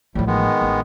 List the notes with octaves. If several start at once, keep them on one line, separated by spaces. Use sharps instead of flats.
A1 A2 F3 G3
D#3 G#3 B3
A1